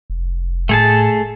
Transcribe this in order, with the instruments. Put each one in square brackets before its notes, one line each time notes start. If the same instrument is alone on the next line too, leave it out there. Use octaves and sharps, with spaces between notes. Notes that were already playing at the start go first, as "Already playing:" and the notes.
[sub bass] F1
[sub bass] A2 [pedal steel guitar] A3 G#4 A5